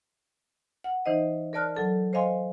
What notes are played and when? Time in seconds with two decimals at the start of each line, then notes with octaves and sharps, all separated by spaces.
0.84 F#5
1.06 E3 D#4 C5 D#5
1.53 A#4 C#5 D5 A5 F6 F#6
1.75 F#3 A4 A5
2.13 C5 C#5 D#5 F5 G#5 C6